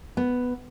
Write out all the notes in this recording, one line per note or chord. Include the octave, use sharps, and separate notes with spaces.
B3